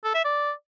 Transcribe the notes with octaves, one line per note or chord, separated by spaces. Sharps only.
A4
E5
D5